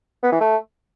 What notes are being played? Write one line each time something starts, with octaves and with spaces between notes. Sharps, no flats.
B3
E3
A3